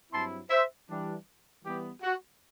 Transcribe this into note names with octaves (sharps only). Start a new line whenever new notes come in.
G2 F#3 C4 E4 A5 C6
C5 E5
E3 G3 D4
E3 G3 B3 G4
F#4